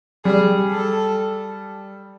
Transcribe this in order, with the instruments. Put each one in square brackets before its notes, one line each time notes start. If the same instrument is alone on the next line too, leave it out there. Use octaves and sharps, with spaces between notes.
[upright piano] G3 [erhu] G#4
[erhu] A4